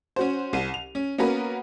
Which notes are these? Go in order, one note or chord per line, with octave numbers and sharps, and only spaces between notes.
C#4 F#4 C5
C2 D#7
F7
C#4
A#3 B3 C#4 F#4 A#4 B4